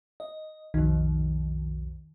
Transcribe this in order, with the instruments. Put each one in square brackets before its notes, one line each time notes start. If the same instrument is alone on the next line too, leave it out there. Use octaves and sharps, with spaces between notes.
[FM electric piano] D#5
[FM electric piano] B1 F2 [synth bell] D#3